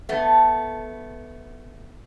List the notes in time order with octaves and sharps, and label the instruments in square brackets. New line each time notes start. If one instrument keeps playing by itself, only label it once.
[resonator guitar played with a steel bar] A3 B3